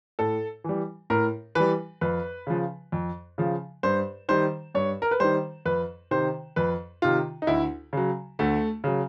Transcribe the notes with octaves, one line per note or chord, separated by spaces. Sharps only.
A2 A4
E3 G3
A2 A#4
E3 G3 B4
F2 B4
C#3 F3
F2
C#3 F3
G2 C5
D#3 G3 C5
G2 C#5
A#4
B4
D#3 G3 C5
F2 B4
C3 D#3 C5
F2 B4
C3 D#3 F4
D#4
D2 E4
C#3 F#3
D2 A3
C#3 F#3